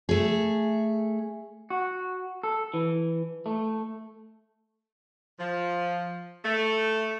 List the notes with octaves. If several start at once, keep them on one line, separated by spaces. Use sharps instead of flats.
A3 G#4
F#4
A4
E3
A3
F3
A3